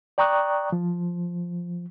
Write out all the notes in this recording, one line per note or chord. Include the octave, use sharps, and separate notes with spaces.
D5 G5 A#5 C#6 D#6 F#6
F3